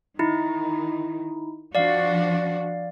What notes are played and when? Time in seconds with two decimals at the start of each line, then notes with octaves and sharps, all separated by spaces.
0.19 D#3 D#4 E4
1.75 F3 D4 F#4 D5 F5